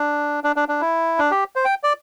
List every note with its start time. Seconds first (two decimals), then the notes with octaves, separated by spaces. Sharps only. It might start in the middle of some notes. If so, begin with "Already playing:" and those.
Already playing: D4
0.44 D4
0.56 D4
0.69 D4
0.81 E4
1.19 D4
1.31 G4
1.56 C5
1.65 G5
1.83 D5